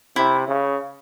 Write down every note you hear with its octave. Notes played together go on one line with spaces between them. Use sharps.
C3 E4
C#3